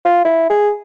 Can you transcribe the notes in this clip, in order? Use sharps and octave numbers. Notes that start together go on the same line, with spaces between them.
F4
E4
G#4